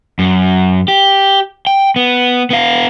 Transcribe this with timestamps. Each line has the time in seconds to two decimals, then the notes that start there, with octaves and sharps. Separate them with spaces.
0.19 F#2
0.88 G4
1.67 G5
1.96 B3
2.50 B3 F5